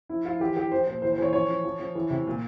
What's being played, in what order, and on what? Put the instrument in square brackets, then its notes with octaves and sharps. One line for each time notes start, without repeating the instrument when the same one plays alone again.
[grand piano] F3 E4
F3 F4
E3 G4
E3 G4
F3 C5
A#2 C5
E3 C5
C5
E3 C#5
F3 C#5
F3
F3
F3
E3
C3
A#2